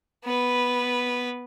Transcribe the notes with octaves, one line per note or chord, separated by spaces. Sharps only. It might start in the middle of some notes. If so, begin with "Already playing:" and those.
B3 B4